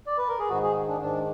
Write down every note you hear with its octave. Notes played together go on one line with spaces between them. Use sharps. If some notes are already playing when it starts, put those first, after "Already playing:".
D5
B4
A#4
G#4
G#2 D#3 F#4
G#4
D4
G#2 D#3 D4